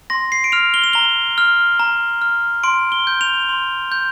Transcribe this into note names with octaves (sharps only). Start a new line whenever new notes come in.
C6 A#6
C7
D7
F6 F7
G7
F7
A#5 G7
F6
A#5
F6
C6 D7
G7
G6
F7
C6
G6